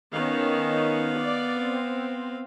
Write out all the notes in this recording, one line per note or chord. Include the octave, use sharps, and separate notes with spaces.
D#3 B3 C#4 F5
D5
C4